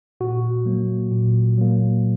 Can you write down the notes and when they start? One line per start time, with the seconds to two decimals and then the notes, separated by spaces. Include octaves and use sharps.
0.21 A#2 F#4
0.66 F#3 A#3
1.12 A#2
1.58 F#3 A#3